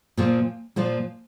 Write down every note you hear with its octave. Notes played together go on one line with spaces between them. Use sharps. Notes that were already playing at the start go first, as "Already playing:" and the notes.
A#2 F3 A#3
A#2 F3 A#3